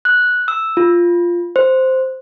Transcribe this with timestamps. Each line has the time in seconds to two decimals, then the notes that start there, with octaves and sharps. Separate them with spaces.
0.05 F#6
0.48 E6
0.77 F4
1.56 C5